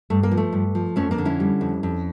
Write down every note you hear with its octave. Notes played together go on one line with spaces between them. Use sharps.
G2 A3
A#3
F3
A3
G2
F3
F2 A3 C#4
A#3 D4
D3
C#4 E4
G3
F2
F2